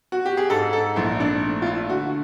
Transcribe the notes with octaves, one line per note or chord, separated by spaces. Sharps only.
F#4
G4
G#4
G#2 A4
A4
A#1 E4
D4
A3
F4
E4
D3 F#4